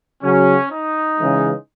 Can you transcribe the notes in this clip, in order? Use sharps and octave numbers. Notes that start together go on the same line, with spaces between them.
C#3 F#3 C#4
D#4
C#3 E3 G#3